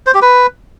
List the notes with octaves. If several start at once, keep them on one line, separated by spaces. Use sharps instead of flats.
C5
G4
B4